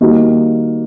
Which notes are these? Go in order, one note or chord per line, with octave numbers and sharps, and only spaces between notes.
D#3 G3 A#3 D#4 F#4